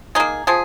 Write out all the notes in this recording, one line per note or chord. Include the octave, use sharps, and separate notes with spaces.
A#3 D#4 G#4
F3 G#4